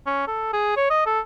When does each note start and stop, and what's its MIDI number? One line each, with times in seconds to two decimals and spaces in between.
0.06 0.27 61
0.27 0.49 69
0.53 0.72 68
0.76 0.85 73
0.90 1.04 75
1.06 1.20 69